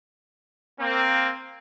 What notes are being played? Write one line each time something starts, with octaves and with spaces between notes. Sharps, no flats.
A#3 C4